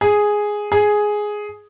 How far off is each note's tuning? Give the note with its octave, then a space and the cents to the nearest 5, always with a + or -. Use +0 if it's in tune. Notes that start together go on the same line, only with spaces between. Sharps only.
G#4 +0
G#4 +5